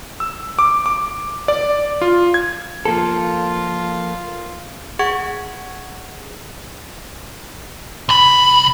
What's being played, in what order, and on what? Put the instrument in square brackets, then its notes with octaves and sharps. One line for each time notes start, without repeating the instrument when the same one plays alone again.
[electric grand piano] E6
D6
D6
D5
F4
G#6
[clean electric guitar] F3 A#3 A4 [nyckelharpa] F4
[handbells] G#4 F#5 C#6 G#6
[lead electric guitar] C2 B5